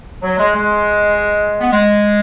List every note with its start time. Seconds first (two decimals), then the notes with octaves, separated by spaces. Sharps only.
0.21 F#3
0.38 G#3
0.54 G#3
1.60 B3
1.71 G#3